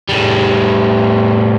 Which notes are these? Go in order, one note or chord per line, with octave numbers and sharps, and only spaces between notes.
A2 G3